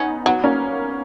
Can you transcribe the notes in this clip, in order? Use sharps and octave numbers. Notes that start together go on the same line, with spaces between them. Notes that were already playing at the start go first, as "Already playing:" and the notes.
Already playing: B3 C#4 D#4
F#3 B3
A#3 C#4